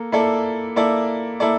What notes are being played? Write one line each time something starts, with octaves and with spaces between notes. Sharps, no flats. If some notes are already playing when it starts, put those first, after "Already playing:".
Already playing: A#3 A4
A#3 E4 A4 D5
A#3 E4 A4 D5
A#3 E4 A4 D5